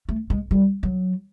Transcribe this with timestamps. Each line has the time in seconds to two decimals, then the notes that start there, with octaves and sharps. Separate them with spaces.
0.09 A3
0.30 G#3
0.51 G3
0.83 F#3